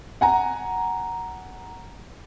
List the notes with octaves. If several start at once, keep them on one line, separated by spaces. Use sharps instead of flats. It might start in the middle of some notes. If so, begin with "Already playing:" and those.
F#5 G#5 A#5